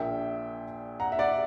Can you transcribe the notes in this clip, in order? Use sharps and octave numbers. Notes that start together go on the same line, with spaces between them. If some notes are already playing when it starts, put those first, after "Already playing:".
Already playing: A#1 A#2 A#3 E5 G5
F#5 A#5
E5
D5 F#5